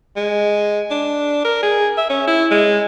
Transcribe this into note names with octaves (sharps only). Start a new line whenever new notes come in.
G#3
D4
A#4
G#4
E5
C#4
E4
G#3